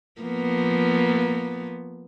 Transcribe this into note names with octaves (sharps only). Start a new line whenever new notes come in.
F3 A#3 B3